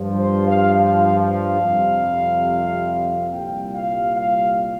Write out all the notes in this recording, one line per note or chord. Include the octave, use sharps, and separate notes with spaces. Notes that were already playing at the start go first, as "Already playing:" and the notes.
Already playing: G2 F3
C5
F5
F5
F5
F2 C3 G3
C2 A#2 G3 G5
F5
F5